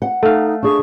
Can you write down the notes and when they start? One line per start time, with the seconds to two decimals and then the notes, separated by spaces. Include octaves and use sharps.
0.02 F#5
0.23 A3 D#4 A4 F5
0.63 D4 G#4 C#6